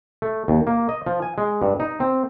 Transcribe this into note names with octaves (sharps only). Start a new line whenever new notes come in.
A3
D#2
A#3
D#5
F3
G#5
G#3
G2
D#4
C4